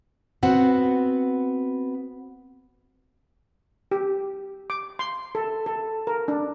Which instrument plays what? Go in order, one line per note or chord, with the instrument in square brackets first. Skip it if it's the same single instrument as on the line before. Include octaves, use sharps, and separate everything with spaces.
[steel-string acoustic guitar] B3 C4 F#4 F#5
[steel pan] G4
D6
C6
A4
A4
A#4
D4